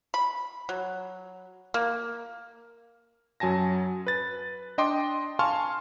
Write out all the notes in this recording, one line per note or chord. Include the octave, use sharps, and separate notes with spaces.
B5
F#3
A#3
F#2 F#3 G#5 A5 A#6
B4 A6
D4 D#5 G5 C6 D6
F5 G#5 A5 C6 C#6 F6